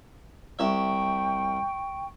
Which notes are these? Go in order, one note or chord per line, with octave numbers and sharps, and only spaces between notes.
C2 E5 G5 C#6